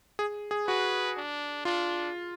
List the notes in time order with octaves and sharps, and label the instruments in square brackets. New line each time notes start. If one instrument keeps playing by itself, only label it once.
[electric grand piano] G#4
G#4
[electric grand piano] F#4 [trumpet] B4
[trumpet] D4
[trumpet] D4 [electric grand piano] F4